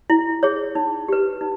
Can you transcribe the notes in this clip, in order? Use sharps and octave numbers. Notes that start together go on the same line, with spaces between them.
E4
G#4 C#5
D#4
G4 B4
D#4